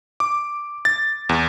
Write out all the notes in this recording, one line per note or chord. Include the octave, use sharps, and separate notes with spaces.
D6
A6
E2